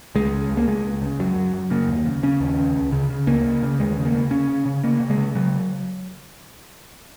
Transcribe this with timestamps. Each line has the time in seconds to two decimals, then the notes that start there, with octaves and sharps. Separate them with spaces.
0.15 C#2 G#3
0.33 C#3
0.50 C#2
0.57 A#3
0.68 C#2 G#3
0.84 C#2
1.02 C#3
1.19 F#2 F#3
1.36 F#2
1.54 F#2
1.70 C#3 A#3
1.88 D#2
2.06 C#3
2.23 C#3 C#4
2.40 D#2
2.58 C#3
2.76 C#2
2.92 C#3
3.10 C#3
3.27 C#2 A#3
3.44 C#3
3.63 C#3
3.79 D#2 G#3
3.97 C#3
4.05 A#3
4.15 C#3
4.31 C#3 C#4
4.49 C#3
4.65 C#3
4.84 C#3 A#3
5.00 C#3
5.10 G#3
5.17 C#3
5.35 C#3 F#3